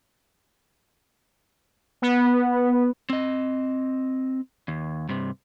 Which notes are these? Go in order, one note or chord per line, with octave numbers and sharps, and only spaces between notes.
B3
C4 D#5
D#2
G2 C3